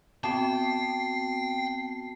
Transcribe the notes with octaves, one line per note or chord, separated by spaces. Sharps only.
B3 C4 F#4 G5 A5 C7